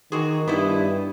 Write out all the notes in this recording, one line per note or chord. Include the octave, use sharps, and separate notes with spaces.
D#3 E3 F#4 G#4
G2 B3 D#4 E4